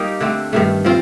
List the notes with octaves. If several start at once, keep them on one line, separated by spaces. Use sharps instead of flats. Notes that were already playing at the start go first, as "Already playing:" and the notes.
Already playing: G3 A#3 D#4 G4
D3 A3 C4
G2 D#3 A3
F3 C4 F4